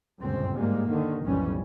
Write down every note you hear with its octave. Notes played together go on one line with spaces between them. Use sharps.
G1 C#2 F#2 A#2 C4
G#2 G3 G#3 A#3
D#2 D3 D#3
B1 F2 A2 E3 G3 C#4